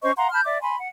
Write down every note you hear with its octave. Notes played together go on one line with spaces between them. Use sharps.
C#4 C5 D#5 C#6
F5 F#5 A#5 C6
A5 B5 F6 G6
D5 E5 D6
G#5 B5 C6
F#5